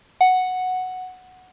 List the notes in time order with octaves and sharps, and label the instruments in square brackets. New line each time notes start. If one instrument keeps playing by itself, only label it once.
[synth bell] F#5